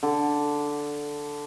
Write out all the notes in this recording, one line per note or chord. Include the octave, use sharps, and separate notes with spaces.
D3